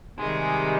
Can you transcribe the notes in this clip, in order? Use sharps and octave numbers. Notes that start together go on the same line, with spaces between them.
C3 D#3 G3 G#3 G#4